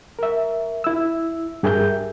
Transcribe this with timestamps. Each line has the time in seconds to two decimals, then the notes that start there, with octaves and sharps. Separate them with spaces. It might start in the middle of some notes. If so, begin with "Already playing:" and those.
0.19 A#4 E5
0.84 E4 E6
1.63 G2 G4 G#4 A#4 E5 G6